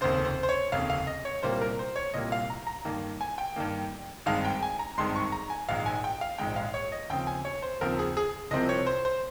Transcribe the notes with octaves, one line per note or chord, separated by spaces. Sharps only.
F1 D#2 C#3 C5
C5
C5
C#5
F1 D#2 C#3 F5
F5
D#5
C#5
C2 A#2 G3 A#3 C5
A#4
C5
C#5
C2 A#2 G3 A#3 D#5
F5
A#5
A#5
G2 D#3 A#3
G#5
G5
G2 D#3 A#3
G#1 G2 D#3 G#3 F5
G5
G#5
A#5
G#1 G2 D#3 G#3 C6
C#6
A#5
G#5
A#1 G#2 D#3 G#3 F5
G#5
G5
F5
A#1 G#2 D#3 G#3 G5
F5
C#5
D#5
D#2 C#3 F3 C4 G5
G#5
C#5
C5
D#2 C#3 F3 C4 A#4
G#4
G#4
C2 C3 F3 C4 D#5
C#5
C5
C5